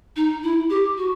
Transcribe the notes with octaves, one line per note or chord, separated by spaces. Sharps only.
D#4
E4
G4
F#4